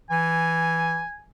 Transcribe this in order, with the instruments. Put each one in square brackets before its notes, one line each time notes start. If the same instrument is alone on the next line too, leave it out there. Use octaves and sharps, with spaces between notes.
[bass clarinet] E3 [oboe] G#5